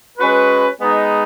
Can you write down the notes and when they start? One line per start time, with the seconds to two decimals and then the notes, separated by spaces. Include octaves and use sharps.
0.18 G#3 C#4 F#4 B4
0.80 G#3 B3 D#4